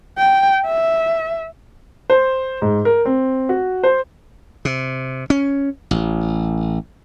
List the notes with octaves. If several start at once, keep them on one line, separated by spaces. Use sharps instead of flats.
G5
E5
C5
G#2
A#4
C4
F#4
C5
C3
C#4
A1